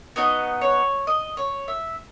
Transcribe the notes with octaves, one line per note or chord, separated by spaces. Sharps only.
B3 D#4 F#4 D#5
C#5
D#5
C#5
E5